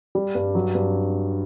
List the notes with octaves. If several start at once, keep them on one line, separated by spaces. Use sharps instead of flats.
G3
G2
F#3
G2